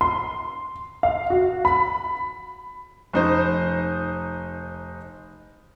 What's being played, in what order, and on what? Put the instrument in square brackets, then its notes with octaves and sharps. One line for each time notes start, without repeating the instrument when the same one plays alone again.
[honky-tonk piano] C6
F5
F#4
B5
[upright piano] F1 D#4 C5